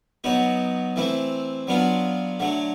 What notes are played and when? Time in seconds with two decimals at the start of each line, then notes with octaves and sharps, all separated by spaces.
0.24 F#3 B3 D#4 F#4
0.96 E3 A3 C4 E4
1.67 F#3 B3 D4 F4
2.40 D3 F#3 A3